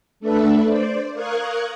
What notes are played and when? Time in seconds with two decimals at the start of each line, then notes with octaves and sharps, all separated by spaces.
0.20 A3 D4 A4 B4 E5
0.66 C5 D5
1.14 A#4 F5 C#6 D#6 F#6 G#6